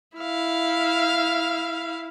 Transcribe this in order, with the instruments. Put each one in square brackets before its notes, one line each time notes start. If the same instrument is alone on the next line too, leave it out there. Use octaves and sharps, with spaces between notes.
[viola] E4 F5